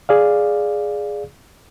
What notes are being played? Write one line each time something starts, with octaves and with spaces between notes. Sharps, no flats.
G#4 D5 F5